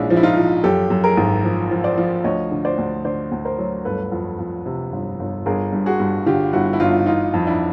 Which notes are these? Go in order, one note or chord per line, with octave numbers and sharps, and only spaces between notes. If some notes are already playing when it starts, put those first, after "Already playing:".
Already playing: A#1 G#3 C#4 D4 E4
F3
E4
D#4 F4
F3
F#2 G4 A4
F#2
G#4 A#4
G#1
F3
F3
C5 D5
F3
D2 C#5 D#5
D3
C5 D5
D2
D3 C5 D5
D2
A#4 C5
F#3
G1 A4 B4
F2
F2
C3
G1
G1
G1 G#4 A#4
G2
F#4 G#4
G2
D3 F4 G4
G1 E4 F#4
E4
G1 D#4 F4
E3 D#4 F4
F2
D4 E4